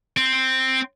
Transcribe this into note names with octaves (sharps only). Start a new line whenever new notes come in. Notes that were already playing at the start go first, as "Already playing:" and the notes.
C4